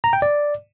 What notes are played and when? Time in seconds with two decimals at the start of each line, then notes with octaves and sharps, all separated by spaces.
0.04 A#5
0.13 G5
0.22 D5